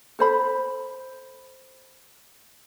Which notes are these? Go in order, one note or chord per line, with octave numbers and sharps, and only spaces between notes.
A4 C5 B5